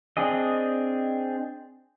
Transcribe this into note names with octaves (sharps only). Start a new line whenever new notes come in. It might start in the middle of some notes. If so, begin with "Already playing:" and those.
C4 D4 G#4 D#5